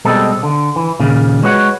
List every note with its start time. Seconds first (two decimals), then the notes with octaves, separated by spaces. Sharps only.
0.05 B2 G3 G#3 C4 A4
0.43 D3
0.76 E3
1.00 D#2 A#2 C#3
1.43 G#3 F#4 B4 C#5 F#5